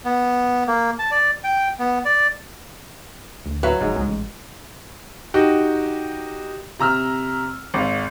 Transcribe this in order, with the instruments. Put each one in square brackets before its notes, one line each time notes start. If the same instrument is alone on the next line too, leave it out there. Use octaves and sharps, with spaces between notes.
[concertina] B3
A#3
A5
D5
G5
B3
D5
[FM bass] D2
[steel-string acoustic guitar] F#3 [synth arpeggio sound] F#4 E5 F5 [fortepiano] B4
[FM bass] F1 [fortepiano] G#2
[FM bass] C2 [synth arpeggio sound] G#3
[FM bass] A1
[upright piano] D#4 F#4 G4
C3 A#5 E6 F6
G#1 F5